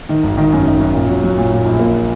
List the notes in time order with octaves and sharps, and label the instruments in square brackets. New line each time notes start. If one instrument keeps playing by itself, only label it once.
[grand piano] D#3
G#1
D#3
F#2
D#3
F#2
A#2
F#3
F#3
A#2
A#2
A#1
A#3